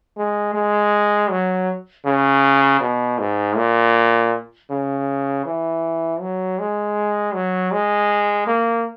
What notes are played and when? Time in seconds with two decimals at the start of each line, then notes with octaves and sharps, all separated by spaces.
0.17 G#3
0.54 G#3
1.30 F#3
2.06 C#3
2.81 B2
3.19 G#2
3.57 A#2
4.70 C#3
5.46 E3
6.21 F#3
6.59 G#3
7.34 F#3
7.72 G#3
8.47 A#3